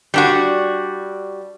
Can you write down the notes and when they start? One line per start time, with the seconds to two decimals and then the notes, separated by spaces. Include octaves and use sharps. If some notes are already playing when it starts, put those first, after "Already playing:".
0.14 G3 D4 F#4